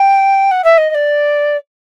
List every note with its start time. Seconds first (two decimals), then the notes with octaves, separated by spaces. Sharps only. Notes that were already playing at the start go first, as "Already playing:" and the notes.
Already playing: G5
0.51 F#5
0.64 E5
0.78 D#5
0.90 D#5
0.95 D5